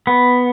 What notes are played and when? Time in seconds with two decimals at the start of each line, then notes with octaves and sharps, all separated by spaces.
0.07 B3